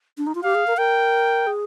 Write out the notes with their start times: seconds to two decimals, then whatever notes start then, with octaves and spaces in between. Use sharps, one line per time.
0.18 D4
0.27 D#4
0.35 F4
0.44 G4 F5
0.55 G#4
0.67 A#4
0.78 A#4 G5
1.47 G#4